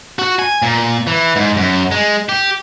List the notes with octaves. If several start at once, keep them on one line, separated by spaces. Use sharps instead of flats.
F#4
G#5
A#2
E3
G#2
F#2
G#3
G4